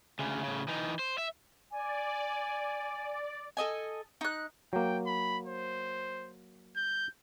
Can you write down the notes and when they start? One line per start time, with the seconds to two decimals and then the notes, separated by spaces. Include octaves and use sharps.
0.19 D2 C#3
0.44 A2 C#3
0.68 E3 D#4
0.99 C5
1.18 E5
1.71 D5 G#5
3.57 A4 D#5 G#5
4.21 D#4 F#6
4.73 F#3 A#3 G5
5.06 B5
5.46 C5
6.76 G6